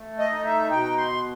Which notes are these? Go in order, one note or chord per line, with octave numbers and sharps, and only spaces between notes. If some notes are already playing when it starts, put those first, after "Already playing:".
Already playing: A3
D#5
D#4
E5
B2 G5
C6